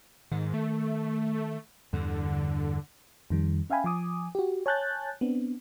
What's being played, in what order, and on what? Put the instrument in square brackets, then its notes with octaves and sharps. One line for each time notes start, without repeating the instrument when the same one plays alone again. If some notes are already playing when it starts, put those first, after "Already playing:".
[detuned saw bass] G#2 [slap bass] D#3
[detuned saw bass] A3
[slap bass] E2 G2 [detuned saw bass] D3
[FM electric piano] F2 D#3 G3
C#4 E5 F5 G5 G#5 B5
F3 G#5 D6 D#6
F#4 G4
C#5 G#5 A5 F#6 G6 A6
B3 C4 D4